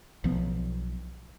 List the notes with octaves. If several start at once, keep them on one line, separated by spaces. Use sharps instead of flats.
B1 F3 B3